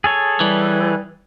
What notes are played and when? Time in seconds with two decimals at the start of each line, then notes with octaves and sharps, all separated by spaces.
0.04 G#4 A4 C#5
0.40 E3 G3